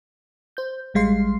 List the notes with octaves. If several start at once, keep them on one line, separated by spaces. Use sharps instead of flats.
C5 G6
A1 G3 G#3 F5 C6 C7